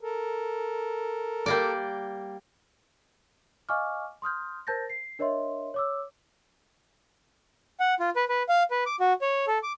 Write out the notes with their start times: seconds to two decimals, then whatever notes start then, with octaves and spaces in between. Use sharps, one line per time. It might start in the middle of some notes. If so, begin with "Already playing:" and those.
0.01 A4 A#4
1.46 G3 A#3 D5
3.69 D#5 F5 G#5 C#6 D6 F6
4.22 C6 D#6 F6 G6
4.67 A#4 C5 A5 G6 A6 A#6
4.90 C7
5.19 D4 A#4 C#5 D#5 E5 C6
5.74 C#5 D6 E6
7.80 F#5
8.00 F4
8.16 B4
8.29 B4
8.49 F5
8.71 B4
8.86 D6
9.00 F#4
9.22 C#5
9.47 A4
9.63 D6